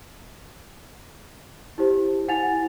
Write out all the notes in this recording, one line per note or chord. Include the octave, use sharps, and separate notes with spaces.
E4 G4 C5
E4 F#5 G#5 A6 F7